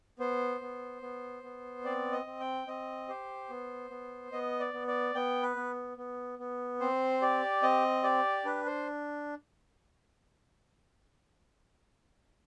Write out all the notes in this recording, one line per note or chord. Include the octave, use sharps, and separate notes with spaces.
B3 C5
B3
B3
B3
C4 D5
D#5
C4
G5
C4 D#5
G4 C5
B3
B3
B3 D#5
D5
B3
D5
B3 G5
B4
B3
B3
B3
C4 C5
G4 D5
C4 D#5
G4 D5
D4 B4
C5